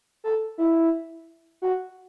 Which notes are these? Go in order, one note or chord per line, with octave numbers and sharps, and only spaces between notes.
A4
E4
F#4